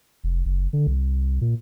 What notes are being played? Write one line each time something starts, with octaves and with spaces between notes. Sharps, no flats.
F1
F#1
D3
C2
A#2